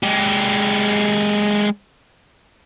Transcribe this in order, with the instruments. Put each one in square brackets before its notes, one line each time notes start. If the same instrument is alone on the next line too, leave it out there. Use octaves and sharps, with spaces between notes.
[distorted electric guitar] G#3 G4